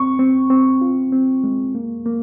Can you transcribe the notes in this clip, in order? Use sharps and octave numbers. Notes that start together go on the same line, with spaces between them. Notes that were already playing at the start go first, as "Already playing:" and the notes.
Already playing: C4 C#6
C4
C4
F4
C4
G#3
A#3
A#3